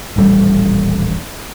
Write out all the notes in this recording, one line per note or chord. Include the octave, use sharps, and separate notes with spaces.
D#1 A1 G3 A3